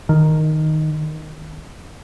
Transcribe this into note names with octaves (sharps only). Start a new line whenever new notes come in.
D#3